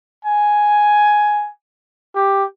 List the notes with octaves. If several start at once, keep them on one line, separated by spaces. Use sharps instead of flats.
G#5
G4